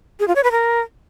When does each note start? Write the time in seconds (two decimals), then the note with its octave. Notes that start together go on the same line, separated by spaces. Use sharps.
0.20 G#4
0.28 F4
0.36 C#5
0.44 B4
0.52 A#4